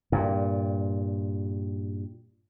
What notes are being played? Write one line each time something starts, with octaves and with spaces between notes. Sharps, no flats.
G2 A#2